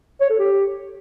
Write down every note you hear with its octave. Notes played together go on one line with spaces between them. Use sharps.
C#5
A4
G4